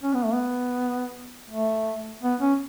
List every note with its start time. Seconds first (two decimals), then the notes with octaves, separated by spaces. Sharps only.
0.03 C#4
0.14 B3
0.25 A3
0.34 B3
1.50 A3
2.23 B3
2.41 C#4